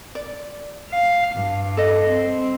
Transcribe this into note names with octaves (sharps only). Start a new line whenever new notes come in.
D5
F5
G2
A4 D#5
C4